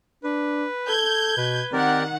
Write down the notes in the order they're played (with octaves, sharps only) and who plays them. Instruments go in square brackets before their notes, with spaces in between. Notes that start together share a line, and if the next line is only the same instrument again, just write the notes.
[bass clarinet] D4 [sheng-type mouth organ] B4
[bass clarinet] A4 [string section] G6 G#6
[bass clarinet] B2 [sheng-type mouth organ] B4
[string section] D#3 F#5 [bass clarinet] C4 [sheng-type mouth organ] G4 A#4 D5